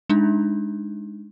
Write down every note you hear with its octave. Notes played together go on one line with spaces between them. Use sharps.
G#3 D4 D#4